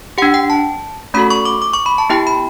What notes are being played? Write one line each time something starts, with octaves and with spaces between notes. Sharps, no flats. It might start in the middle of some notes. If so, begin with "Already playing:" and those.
D4 G4 F#5
G5
A5
A3 C#4 F#4 A4 B5
C#6
D6
D6
C#6
B5
A5
B3 E4 G4 G5
B5